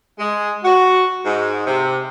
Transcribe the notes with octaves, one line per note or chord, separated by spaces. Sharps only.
G#3
F#4
G#2
C3